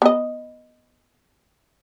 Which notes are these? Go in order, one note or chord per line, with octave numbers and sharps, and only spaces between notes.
B3 D#5